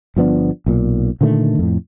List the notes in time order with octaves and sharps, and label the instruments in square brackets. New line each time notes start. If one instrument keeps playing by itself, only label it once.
[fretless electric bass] G1 F3 B3 D4
B1 A#2
A#2 D3 D#3 A3
F2 A2